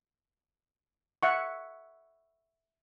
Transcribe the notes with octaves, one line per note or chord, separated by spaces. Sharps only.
E5 F#5 C#6